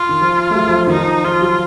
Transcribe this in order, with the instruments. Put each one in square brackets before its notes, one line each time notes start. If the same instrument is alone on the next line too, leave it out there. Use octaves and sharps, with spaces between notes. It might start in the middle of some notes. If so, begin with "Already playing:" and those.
Already playing: [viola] F4
[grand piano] D#3
F3
A3
F#3
F3
F3
[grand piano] D#3 [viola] D#4
[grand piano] F3
[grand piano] F3 [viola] F4
[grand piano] F#3